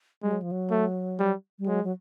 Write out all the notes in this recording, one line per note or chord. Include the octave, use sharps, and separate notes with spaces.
G3 G#3
F#3
F3
F#3
A3
G3
G3
F#3 G#3
F#3